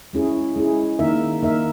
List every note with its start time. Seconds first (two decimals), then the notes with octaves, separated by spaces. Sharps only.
0.13 G#3 C#4 E4 G#4
0.56 G#3 C#4 E4 G#4
0.99 D#3 A#3 D#4 A#4 E5
1.42 D#3 A#3 D#4 A#4 E5